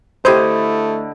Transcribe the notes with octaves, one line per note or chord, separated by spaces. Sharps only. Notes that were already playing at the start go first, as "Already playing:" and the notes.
D3 A3 E4 G4 C5 D#5